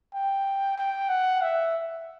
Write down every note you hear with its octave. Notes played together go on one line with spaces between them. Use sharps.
G5
G5
F#5
E5